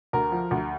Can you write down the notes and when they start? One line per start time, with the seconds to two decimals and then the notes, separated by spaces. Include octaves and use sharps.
0.13 D2 A#4
0.32 F3
0.51 D2